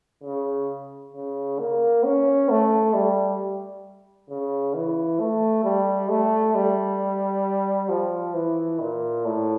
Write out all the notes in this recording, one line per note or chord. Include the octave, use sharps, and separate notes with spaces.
C#3
C#3
A#3
C#4
A3
G3
C#3
E3
A3
G3
A3
G3
F3
E3
A#2
A2